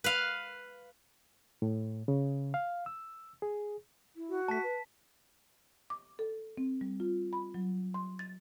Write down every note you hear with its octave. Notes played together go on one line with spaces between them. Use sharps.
B4 F5
A2
C#3
F5
E6
G#4
E4
F#4
A3 A5 B6
B4
D6
A4
C4
G3
F4
B5
F#3
C6
A6